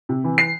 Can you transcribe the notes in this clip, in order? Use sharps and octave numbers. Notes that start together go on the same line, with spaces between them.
C3
E3
C7